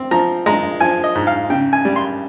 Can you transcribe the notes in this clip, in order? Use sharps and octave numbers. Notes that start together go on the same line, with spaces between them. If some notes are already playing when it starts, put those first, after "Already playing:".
Already playing: C4
F3 A#5
G#3 A#5
F3 G#5
D#5
G#2
F5
C#3 G5
G#5
G3
C6